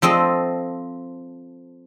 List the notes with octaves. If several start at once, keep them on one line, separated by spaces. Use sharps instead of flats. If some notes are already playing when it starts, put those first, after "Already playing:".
F3 C4 A4 D#5